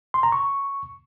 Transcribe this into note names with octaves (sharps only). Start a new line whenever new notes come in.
C6
A#5
C#6